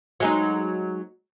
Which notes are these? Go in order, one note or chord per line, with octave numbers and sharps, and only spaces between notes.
F#3 G#3 D#4